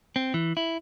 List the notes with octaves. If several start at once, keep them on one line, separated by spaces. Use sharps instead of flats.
C4
E3
E4